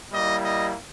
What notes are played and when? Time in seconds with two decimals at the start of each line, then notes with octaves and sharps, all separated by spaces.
0.13 G3 A#3 E4 D#5
0.45 D#5